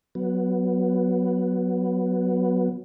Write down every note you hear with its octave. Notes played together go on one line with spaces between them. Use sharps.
F#3 B3